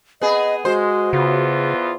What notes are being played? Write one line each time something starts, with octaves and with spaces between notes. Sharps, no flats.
B3 G#4 D#5
G#3 F#4 C5
E2 C#3 B3 F4